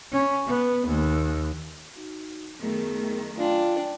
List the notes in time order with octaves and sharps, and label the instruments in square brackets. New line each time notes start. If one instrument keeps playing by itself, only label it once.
[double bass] C#4
B3
D#2
[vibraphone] D#4 F#4
[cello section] F#2 D#3 A3 [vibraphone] B3 G#4 A#4
[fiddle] D4 [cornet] F4 [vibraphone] G5 G#5